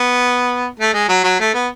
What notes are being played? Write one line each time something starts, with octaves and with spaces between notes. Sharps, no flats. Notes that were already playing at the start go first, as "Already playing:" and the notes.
Already playing: B3
A3
G#3
F#3
F#3
A3
B3